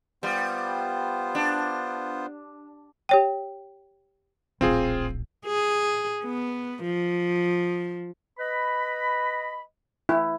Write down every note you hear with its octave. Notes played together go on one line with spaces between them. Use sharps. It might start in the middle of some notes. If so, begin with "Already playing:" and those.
G3 B3 F4 C5
D4
G4 C#5 G5
D1 A#1 C4 F4 G#4
G#4
B3
F3
B4 D#5 B5
E4